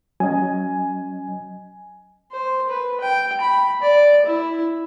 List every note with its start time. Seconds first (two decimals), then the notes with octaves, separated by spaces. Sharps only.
0.20 F#3 C#4 D#5 G#5
2.32 C5
2.69 B4
3.01 G5
3.41 B5
3.82 D5
4.26 E4